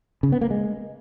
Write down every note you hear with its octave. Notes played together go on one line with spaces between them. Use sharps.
C#3
B3
A#3
G#3